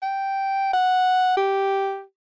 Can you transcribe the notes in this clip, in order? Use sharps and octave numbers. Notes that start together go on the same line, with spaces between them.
G5
F#5
G4